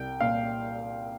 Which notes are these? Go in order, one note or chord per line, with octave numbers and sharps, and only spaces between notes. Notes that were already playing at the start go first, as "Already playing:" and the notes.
Already playing: C2 G5
A#2 F5